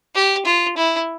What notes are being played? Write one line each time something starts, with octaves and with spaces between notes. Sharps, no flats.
G4
F4
E4